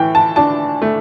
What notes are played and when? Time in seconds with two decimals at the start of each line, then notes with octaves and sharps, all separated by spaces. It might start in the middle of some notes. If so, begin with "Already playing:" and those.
Already playing: A2 E3 G5
0.15 A5
0.36 D4 A5
0.82 A3